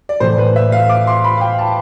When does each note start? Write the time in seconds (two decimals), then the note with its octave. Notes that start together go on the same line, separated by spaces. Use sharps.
0.09 D5
0.20 A2 E3 A3 C5
0.38 B4
0.56 E5
0.72 F5
0.90 D6
1.07 C6
1.24 B5
1.37 F5
1.41 G5
1.58 A5